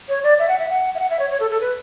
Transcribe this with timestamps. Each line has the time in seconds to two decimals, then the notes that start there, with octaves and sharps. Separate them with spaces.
0.09 C#5
0.23 D5
0.39 E5
0.49 F#5
0.59 E5
0.69 F#5
0.95 E5
0.99 F#5
1.10 E5
1.20 C#5
1.30 C#5
1.40 A4
1.51 A4
1.61 B4